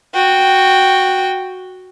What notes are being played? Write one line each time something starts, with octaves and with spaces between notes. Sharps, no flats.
F#4 G5